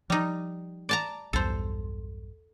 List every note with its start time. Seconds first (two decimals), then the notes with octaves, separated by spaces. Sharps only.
0.10 F3 G3 D#4
0.89 D5 A5 A#5
1.33 B1 E2 G2 A4 C5